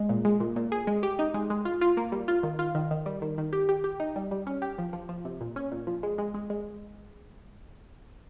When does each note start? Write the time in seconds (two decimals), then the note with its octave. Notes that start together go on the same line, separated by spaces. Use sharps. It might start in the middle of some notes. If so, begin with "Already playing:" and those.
Already playing: G#3
0.09 A#2
0.25 G#3
0.40 A#2
0.56 A#2
0.72 G#4
0.87 G#3
1.03 G4
1.19 D#4
1.34 G#3
1.50 G#3
1.65 F4
1.81 F4
1.97 A#3
2.12 G3
2.28 F4
2.43 D#3
2.59 F4
2.75 D#3
2.91 D#3
3.06 G3
3.22 D#3
3.38 D#3
3.53 G4
3.69 G4
3.84 G4
4.00 D#4
4.16 G3
4.31 G3
4.47 C#4
4.62 G4
4.78 F3
4.93 F3
5.09 F3
5.25 C3
5.41 A#2
5.56 C#4
5.72 A#2
5.87 F3
6.03 G#3
6.18 G#3
6.34 G#3
6.50 G#3